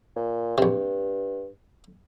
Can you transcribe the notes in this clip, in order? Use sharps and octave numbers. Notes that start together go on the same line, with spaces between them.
A#2
A#1 G2 C3